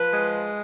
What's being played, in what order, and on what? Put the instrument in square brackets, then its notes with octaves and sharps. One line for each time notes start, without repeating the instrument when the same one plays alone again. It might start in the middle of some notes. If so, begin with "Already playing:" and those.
Already playing: [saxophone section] F3 B4
G#3